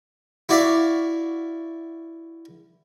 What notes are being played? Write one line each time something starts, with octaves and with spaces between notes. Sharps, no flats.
E4 F#4 D5 E5 F5